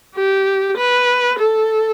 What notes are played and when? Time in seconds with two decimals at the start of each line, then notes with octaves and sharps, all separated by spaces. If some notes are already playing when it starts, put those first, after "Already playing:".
0.15 G4
0.77 B4
1.39 A4